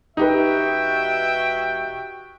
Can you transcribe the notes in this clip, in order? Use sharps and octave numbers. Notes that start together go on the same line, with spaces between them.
E1 D#4 F#4 G4 B4 E5 G5